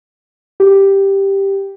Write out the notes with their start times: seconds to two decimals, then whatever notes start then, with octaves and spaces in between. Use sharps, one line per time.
0.60 G4